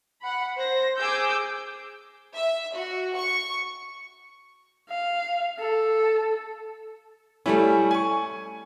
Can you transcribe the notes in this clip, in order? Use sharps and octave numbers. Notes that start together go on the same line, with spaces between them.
F#5 B5
C5 A#6
G#4 D6 E6 G6
E5
F#4
C#6
F5
A4
G3 A3 C#4 E4
G#5 C#6